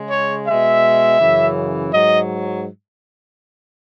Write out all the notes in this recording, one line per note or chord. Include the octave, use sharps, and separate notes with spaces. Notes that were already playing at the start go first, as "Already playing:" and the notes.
Already playing: C#3 G#3
C#5
B2 G#3 E5
F#2 C#3 E3
G#2 F#3 D#5